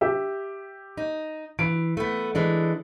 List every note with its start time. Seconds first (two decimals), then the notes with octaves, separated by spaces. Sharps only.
0.01 G4 E5
0.97 D#4
1.59 E3 D7
1.97 A3 B3
2.35 E3 G#3 D4